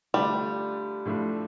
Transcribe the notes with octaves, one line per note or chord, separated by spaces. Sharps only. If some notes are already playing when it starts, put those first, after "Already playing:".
D3 G3 A3 D4 F4
A2 F3 A3 D4